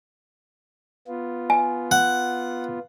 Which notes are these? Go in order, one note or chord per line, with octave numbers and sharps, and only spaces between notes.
B3 F4
G#5
F#5